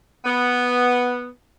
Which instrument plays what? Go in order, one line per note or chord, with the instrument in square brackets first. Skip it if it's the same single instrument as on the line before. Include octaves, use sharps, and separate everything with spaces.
[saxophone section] B3